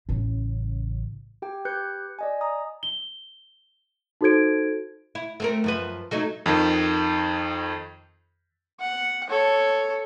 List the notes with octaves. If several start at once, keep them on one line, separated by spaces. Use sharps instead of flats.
A1 C#3
G4 G5
G4 B4 F#6 G6 C#7
D5 D#5 G#5
A#5 D#6
G7
D#4 F#4 A4 C5 G#6 D7
E4
A3 C4 A#4
F#2 F3 B4
F#3 A3 D#4
F2 D#3
F#5
A4 C#5